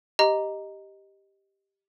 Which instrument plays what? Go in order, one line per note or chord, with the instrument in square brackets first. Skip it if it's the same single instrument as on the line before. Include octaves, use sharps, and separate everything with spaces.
[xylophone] G4 D#5 A#5